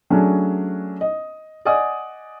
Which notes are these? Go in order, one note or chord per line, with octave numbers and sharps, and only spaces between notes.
F#3 A3 C#4 D4 G#4
D#5
D5 D#5 F#5 G#5 D#6